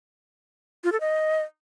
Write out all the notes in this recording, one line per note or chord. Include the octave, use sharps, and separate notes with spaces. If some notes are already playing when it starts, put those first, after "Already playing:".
F4
A4
D#5